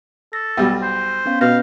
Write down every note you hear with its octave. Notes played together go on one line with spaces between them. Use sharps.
A4 A#6
B1 G3
C5
B3 C#4 F5
B2 B4 F5 G6 A#6